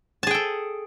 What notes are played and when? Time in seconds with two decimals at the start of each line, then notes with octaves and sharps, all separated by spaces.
0.23 A5
0.27 G#4
0.31 G5
0.34 A4